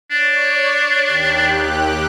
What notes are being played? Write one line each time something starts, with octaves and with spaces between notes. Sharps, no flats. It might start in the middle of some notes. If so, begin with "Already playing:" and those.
D4 C#5 D5
D#2 G4 F#6